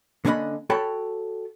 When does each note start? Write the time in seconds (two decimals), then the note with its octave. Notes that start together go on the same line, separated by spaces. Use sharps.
0.25 D3 A#3 C#4 D4 D#5 B5
0.70 F#4 A4 C#5 G5 A5 B5